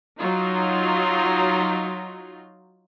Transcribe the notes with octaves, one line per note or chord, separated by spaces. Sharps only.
F#3 D#4 F4